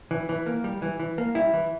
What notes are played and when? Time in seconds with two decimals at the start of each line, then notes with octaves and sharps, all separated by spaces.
0.11 E3
0.29 E3
0.46 A#3
0.64 G3
0.82 E3
1.00 E3
1.18 A#3
1.35 G3 E4
1.54 E3